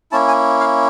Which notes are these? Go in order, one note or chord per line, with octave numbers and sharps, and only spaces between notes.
A#3 C#4 E4 A5
G#5
F5